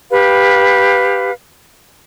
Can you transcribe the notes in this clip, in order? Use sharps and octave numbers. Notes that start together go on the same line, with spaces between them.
G4 B4 F5